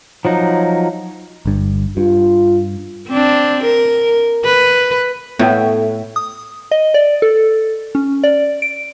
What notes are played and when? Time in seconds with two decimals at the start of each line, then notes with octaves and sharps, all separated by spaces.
0.25 F3 F#3 D#4
1.46 G1 G2
1.97 G2 F4
3.08 C4 D4
3.63 A#4
4.45 B4
5.39 A2 B3 A4 C#5 E5 G5
6.16 D#6
6.71 D#5
6.94 D5
7.22 A4
7.95 C#4
8.24 D5
8.62 D7